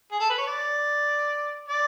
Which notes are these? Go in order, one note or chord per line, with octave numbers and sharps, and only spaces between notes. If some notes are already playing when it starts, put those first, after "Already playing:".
G#4
A4
B4
C#5
D5
D5